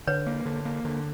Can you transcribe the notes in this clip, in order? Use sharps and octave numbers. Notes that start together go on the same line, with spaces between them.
D3 B4 C#5
A#3
D3
A#3
D3